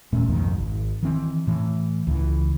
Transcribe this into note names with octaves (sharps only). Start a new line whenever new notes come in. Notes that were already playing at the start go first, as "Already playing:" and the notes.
D#1 A#2 A3 C#4
B1 F2 G#2 D#3
G#1
D#3 E3 C4
A2 E3
C#2 E3